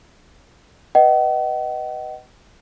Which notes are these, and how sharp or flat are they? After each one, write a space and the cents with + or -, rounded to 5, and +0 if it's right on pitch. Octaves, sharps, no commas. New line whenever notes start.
B4 +0 D#5 +0 F#5 +40